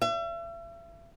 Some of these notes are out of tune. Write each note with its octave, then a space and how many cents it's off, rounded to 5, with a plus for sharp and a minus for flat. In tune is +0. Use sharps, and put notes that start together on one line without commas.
E5 +40